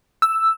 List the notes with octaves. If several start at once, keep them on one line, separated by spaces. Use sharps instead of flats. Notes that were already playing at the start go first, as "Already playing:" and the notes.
E6